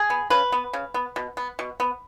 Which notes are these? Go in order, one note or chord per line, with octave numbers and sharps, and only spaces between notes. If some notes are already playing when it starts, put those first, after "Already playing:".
Already playing: G#4
B3
C#3 B4
B3
C#3
B3
B2
B3
B2
B3